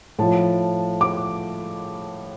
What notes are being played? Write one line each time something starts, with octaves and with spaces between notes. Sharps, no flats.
A2 F3 A5
D6